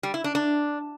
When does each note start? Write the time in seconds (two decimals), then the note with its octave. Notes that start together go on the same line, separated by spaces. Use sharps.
0.03 G3
0.14 E4
0.24 D4
0.35 D4